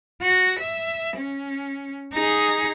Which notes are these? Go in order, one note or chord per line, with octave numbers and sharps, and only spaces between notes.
F#4
E5
C#4
D#4 G#4